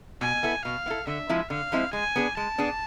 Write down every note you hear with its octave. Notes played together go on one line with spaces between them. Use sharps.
B2 G#5
B3 E4 A4
B2 F5
B3 E4 A4
D3 E5
F3 G#3 C4 E4
D3 F5
F3 G#3 C4 E4
G#3 G#5
B3 D4 G#4
G#3 A5
B3 D4 G#4